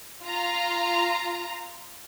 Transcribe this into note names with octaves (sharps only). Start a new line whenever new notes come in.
F4 A#5